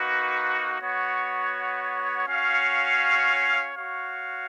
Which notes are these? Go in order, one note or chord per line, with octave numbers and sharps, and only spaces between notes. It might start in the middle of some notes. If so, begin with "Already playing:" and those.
Already playing: A#3 D#4 F#4 B4
B3 F#4 C#5
C#4 F#4 C#5 F5
F#4 C#5 F5